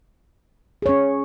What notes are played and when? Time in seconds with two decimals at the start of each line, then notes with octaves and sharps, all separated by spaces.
0.82 G#4
0.86 C#5
0.89 C#4